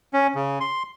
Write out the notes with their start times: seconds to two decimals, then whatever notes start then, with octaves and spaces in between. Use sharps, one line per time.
0.13 C#4
0.35 C#3
0.60 C6